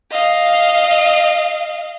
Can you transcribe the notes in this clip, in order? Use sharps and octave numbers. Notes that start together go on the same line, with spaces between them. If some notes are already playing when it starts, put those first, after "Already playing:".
D#5 F5